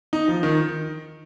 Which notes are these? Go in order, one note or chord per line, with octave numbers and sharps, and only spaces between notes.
D#4
F3
D#3